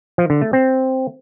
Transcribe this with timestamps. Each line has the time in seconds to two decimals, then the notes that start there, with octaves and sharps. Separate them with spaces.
0.18 F3
0.30 D3
0.41 A3
0.53 C4